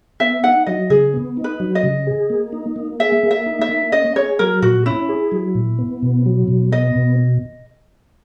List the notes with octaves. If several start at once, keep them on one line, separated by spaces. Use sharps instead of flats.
B3 E5
D#4 F#5
F#3 D#5
C#3 G#4
B3
D#4
B4
F#3
D#5
C#3
G#4
A#3
D#4
A#3
G#4 E5
A#3
E5
D#4
E5
A#3
C#4 D#5
G#4 C#5
F#3 A#4
A#2 F#4
C#4 E4
G#4
F#3
A#2
B3
B2
F#3
B2
B3 D#5
B2